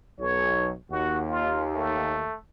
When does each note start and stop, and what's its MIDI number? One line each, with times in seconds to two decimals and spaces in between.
0.20 0.72 35
0.20 0.72 73
0.91 2.28 39
0.91 1.21 66
1.29 1.64 65
1.74 2.36 57